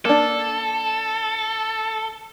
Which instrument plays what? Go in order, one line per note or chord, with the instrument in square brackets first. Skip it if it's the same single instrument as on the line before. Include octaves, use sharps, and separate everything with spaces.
[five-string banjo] A#3 D4 [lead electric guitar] A4